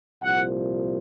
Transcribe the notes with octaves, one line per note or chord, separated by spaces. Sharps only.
C2 A#2 F3 F#5